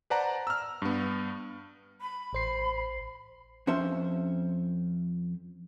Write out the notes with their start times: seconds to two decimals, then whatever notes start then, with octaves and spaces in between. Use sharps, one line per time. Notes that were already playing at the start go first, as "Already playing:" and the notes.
0.10 B4 C5 D5 F#5 A5 A#5
0.47 E6 F6
0.82 G2 B3
2.01 B5
2.33 A1 C5 C7
3.67 F2 C#4 C5 E5